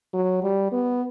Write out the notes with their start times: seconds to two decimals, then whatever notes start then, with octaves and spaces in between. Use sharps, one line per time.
0.14 F#3
0.43 G3
0.72 B3